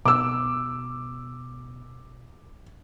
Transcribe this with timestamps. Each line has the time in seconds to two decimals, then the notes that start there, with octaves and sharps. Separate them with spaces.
0.05 B2 D6 E6